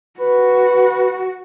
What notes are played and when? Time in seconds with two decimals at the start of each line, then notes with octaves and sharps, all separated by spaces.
0.20 F#4 B4